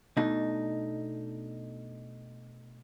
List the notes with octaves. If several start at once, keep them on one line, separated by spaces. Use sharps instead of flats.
B2 A3 D4 D#4